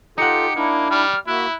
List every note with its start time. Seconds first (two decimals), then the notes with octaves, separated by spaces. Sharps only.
0.18 D#4 F4 G4 A4 F#5 C#7
0.56 A#3 D4 E4
0.90 G3 F6
1.27 A#3 E4 F#4 E5 F#6